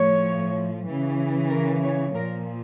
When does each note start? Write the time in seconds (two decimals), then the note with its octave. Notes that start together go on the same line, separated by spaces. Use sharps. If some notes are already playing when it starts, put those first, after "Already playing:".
Already playing: A2 F3 C#5
0.87 C#3 E3
1.50 A#4
1.83 C#5
2.13 A#2 F3 A#4